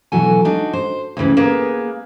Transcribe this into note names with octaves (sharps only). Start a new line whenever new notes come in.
B2 E3 F#3 F#4 A4 G#5
D4 D#4 F#4
C5
D2 G2 C#3 E3
A#3 B3 G#4 B4